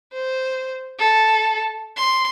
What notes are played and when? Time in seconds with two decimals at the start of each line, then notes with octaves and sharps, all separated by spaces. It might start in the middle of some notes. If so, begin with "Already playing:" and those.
0.13 C5
0.99 A4
1.97 C6